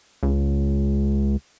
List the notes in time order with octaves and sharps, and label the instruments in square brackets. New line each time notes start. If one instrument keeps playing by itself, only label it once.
[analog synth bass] C#2